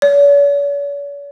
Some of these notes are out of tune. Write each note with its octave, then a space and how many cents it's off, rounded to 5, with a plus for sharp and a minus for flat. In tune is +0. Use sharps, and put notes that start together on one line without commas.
C#5 +45